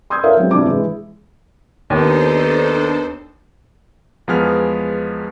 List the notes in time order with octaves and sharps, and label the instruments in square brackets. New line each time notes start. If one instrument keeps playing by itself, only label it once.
[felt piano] C6 D#6 E6 G6 G#6
F4 A4 A#4 C#5 E5 F5
F#3 G#3 C4
C3 E3 D4 F4 D6
E3 G#3
[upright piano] D#2 [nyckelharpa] B3 D#4 [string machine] D4 A4 C5
[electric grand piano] E2 F3 G#3 B3 G#4 F6